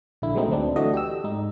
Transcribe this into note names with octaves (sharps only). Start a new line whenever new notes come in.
A#1 D3 E4
F#3 G#3 A3 B3 C4 D#4
D2 F#3 C4 D4
E3 A3 D4 F#4 D#5
G4 E6
G#2 D#4